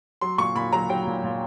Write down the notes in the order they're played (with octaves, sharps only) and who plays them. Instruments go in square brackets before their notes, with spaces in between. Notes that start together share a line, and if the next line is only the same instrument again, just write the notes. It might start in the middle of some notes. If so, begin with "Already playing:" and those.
[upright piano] F#3 C6
A#2 C#6
A#2 B5
F#3 A#5
F#3 G5
A#2
A#2